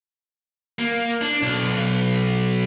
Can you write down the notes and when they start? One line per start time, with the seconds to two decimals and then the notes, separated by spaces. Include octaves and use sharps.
0.79 A#3
1.22 D4
1.42 B1